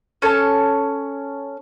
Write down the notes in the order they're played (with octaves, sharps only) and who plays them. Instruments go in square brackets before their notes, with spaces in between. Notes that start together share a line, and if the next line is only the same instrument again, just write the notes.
[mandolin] C#4 A4 C#5 A5